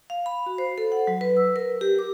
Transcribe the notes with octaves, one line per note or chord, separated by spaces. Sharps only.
F5
B5
F#4
C5
A4
F#5
F#3
B4
E6
A#4
G4
D6